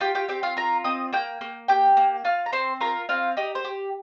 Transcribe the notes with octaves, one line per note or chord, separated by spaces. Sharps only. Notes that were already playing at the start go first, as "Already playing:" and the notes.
F4 G4 G5
G4 G5
C4 G4 G5
F4 F5
F4 A#4 A#5
C4 D#5 D#6
A#3 G5 G6
A#3
G4 G5 G6
A#3
F4 F5 F6
A#5
C4 C5 C6
F4 A#4 A#5
C4 F4 F5
D#4 G4 D#5
C5
G4